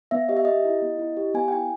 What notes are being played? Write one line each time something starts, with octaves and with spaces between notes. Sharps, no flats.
B3 E5
G4 D#5
E5
G4 D#5
E4
B3
E4
G4
B3 G#5
G5
E4 G#5